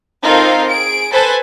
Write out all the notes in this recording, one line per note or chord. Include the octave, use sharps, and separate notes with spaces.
C4 D#4 F4 A4 A#4 F5
G#4 D7
A4 B4 C5 G#5 A5